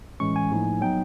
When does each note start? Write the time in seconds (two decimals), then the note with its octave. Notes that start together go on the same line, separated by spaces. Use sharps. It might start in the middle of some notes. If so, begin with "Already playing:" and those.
0.20 A2 E3 G#3 C#4 C#6
0.36 G#5
0.51 A2 F3 A#3 D#4
0.81 F#3 B3 D#4 G5